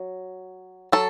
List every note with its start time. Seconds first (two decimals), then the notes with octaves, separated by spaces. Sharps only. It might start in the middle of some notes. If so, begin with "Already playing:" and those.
Already playing: F#3
0.92 F#3 A4